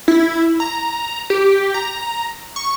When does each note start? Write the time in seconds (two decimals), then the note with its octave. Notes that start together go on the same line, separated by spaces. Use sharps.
0.08 E4
0.60 A#5
1.30 G4
1.74 A#5
2.56 C#6